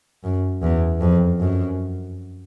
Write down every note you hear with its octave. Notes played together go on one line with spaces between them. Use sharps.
F#2
E2
F2
F#2